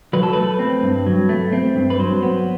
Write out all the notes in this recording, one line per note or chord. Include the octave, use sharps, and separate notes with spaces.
F#3 B4
A4
A3 B4
C4
G2
F#3
A3
C4
G2
B4
F#3 C5
B3